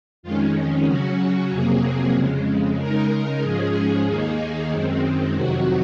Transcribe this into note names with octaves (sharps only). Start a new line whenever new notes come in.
F2 D#3 G#3 C#4 F4
C#3 F#3 C#4 F#4
F2 C3 F#3 A#3 G#4
F2 C#3 G#3
C#3 G#3 D#4 A#4
G#2 F3 G#3 C#4 G#4
D#2 D#3 A#3 D#4 G#4
F#2 D#3 G#3 C4
F2 C3 D#3 F#3 F#4